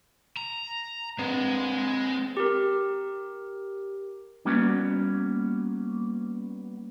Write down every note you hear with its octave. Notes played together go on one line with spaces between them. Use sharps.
A#5
G#3 C4 B4
G4 A#4
G3 A#3 B3 C#4 F#4